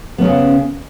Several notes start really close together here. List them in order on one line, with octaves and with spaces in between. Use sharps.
B3 C#4 C#3